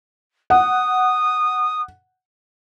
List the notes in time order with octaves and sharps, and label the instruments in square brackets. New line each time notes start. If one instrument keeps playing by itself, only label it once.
[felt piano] F#5 [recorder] D#6